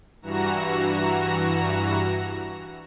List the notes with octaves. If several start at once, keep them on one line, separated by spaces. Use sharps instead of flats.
G2 E3 F#4 A#5 A#6 E7